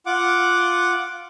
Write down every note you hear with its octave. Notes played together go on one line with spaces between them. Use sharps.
F4 F#5 D6